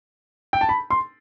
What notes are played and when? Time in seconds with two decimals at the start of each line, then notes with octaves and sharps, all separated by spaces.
0.53 G5
0.61 A5
0.69 B5
0.90 C6